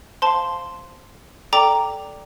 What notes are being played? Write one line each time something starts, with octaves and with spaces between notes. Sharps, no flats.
C5 F5 A5 C6
A4 D5 G5 A#5 D6